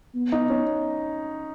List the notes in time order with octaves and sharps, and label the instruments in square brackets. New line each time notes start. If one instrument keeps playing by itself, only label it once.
[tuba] B3
[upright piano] D#4
C#4